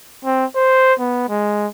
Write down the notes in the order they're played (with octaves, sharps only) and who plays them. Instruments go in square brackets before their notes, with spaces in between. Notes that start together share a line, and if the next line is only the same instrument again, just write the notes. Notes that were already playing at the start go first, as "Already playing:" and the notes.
[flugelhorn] C4
C5
B3
G#3